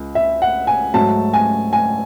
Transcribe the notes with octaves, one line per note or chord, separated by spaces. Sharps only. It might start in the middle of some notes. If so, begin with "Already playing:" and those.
Already playing: C#2
E5
F#5
G#5
G#2 F#3 A3 A5
G#5
G#5